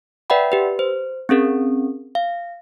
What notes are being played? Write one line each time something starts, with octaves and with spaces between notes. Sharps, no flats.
B4 D5 E5 F#5 G5 B5
G4 B4
C5
C4 C#4 G#4 A#4
F5